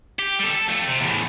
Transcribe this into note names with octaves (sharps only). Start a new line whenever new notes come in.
G4
G3 A4
A4
F2 A3
C3
E2 A2